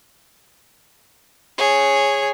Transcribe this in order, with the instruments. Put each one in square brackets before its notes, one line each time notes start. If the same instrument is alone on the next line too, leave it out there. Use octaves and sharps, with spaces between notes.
[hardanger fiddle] G#4 C#5